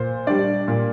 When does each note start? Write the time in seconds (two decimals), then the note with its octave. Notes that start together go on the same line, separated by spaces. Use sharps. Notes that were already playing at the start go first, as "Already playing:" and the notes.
Already playing: A#2 C5
0.27 G3 D4 D5
0.68 A#2